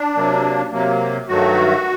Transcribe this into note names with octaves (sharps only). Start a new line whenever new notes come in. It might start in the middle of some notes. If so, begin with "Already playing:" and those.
Already playing: D4
C3 F#3 A#3
C3 F#3 A#3
G2 D#3 F#3 A3 F#4